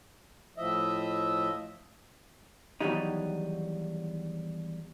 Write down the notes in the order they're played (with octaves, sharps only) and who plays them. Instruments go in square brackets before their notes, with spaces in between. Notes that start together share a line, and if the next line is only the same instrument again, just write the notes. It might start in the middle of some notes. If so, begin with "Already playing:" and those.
[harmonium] A2 F3 D#5 E5
[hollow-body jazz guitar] E2 A2 D#3 F#3 G3 D#4